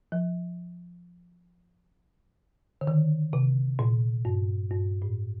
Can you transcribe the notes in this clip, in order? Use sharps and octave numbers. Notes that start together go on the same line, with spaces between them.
F3
D3
D#3
C3
A#2
G2
G2
A2